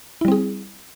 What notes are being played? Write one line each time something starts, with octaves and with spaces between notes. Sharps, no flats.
G3 C4 E4 G#4